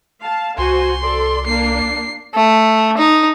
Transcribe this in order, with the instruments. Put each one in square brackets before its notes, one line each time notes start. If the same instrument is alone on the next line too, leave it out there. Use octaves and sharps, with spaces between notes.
[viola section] F5 A5
[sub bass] C2 [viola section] F#4 C5 G#5 [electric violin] C6
[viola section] A4 D5
[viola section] A#3 D4 [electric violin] C7
[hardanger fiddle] A3
D#4